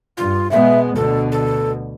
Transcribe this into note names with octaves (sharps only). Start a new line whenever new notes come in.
G2 F4
B2 G#3 B3 E5
D2 B2 D3 A4
A4